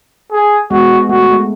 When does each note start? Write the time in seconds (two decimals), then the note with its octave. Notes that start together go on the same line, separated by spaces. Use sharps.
0.32 G#4
0.70 G#3 B3 F#4
1.09 A3 F#4
1.29 G#3